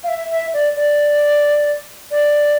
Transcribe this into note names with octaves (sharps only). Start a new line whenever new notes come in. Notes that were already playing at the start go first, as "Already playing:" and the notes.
F5
E5
E5
D5
D5
D5